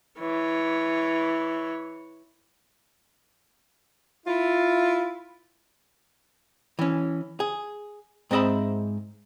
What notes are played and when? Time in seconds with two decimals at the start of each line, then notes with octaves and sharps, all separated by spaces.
0.20 E3 C#5
4.26 E4 F4
6.79 E3 C#4
7.40 G#4
8.31 G#2 C4 D#5 E5 B5